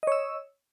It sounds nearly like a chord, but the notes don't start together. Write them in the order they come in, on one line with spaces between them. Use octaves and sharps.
D#5 C#5 E6